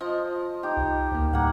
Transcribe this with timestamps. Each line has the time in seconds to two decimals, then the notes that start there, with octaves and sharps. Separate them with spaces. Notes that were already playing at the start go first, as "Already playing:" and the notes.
0.01 F3 D#5
0.63 D#4 G4
0.77 C2
1.12 D2 A#3
1.33 A2 G3 A#3 A4 F#5